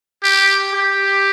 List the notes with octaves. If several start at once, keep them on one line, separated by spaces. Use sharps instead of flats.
G4
G4